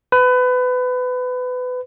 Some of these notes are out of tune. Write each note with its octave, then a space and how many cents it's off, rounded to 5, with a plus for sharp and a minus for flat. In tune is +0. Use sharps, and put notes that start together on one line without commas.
B4 +25